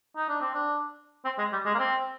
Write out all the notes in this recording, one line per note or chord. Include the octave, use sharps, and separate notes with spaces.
D#4
D4
C4
D4
C4
G#3
G3
G#3
A#3
C4